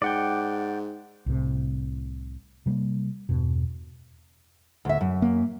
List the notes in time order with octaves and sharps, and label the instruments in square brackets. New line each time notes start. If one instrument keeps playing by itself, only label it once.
[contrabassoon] G#2 [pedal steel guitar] D5 F#5 G5
[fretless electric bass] C2 A2 C3
C3 G3 A3 A#3
E2 G2 B2
[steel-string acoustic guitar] D2 E5
F#2
[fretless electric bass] A#3